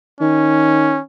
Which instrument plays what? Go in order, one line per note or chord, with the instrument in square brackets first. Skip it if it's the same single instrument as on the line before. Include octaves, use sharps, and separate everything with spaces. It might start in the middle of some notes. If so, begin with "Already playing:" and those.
[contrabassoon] D#3 [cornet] C#4